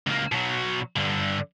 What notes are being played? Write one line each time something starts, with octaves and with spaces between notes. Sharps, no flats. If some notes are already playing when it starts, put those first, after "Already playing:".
C#2 A#3
B2 F#3
G2 D3